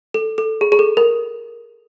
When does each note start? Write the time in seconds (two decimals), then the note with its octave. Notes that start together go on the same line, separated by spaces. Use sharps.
0.14 A4
0.38 A4
0.61 G#4
0.72 G#4
0.79 A4
0.97 A#4